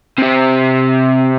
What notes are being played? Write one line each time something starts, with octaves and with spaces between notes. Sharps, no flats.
C3 C4